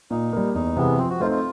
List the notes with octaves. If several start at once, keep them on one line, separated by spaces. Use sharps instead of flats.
A#2 D#4
G3 A#3
E2 D#4
C3 E3 G#3 B3
F3 C4
F#4
A3 C4 D#4 F4
F4